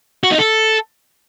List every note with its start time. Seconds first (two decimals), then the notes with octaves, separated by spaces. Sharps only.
0.24 F#4
0.31 D#4
0.38 A4